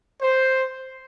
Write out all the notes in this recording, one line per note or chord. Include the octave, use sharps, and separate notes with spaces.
C5